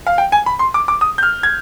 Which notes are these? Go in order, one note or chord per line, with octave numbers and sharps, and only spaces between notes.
F5
G5
G#5
B5
C6
D6
D6
D#6
G6
F6
G#6